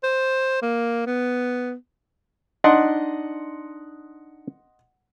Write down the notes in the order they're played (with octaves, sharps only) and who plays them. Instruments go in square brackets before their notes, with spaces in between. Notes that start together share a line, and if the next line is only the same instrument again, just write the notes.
[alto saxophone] C5
A#3
B3
[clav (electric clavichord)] D4 D#4 [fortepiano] D#5 F#5 C6